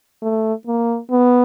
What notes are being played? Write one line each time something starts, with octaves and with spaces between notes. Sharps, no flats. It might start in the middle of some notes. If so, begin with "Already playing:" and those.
A3
A#3
B3